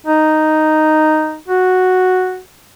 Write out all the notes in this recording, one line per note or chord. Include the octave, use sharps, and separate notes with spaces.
D#4
F#4